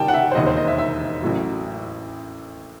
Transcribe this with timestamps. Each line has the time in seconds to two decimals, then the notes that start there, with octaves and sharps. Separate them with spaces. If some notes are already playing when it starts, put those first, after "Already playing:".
Already playing: D#3 G3 G5 A5
0.08 F#5
0.14 E5
0.31 C5
0.35 E1 D#2 D#3 D#5
0.46 C5
0.57 D#5
0.67 E5
0.78 E5
1.22 A1 A2 F#3